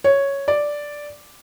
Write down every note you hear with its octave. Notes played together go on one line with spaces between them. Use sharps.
C#5
D5